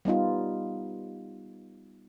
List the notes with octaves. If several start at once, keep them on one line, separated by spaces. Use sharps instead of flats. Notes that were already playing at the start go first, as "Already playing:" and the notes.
G3 B3 D#4 F4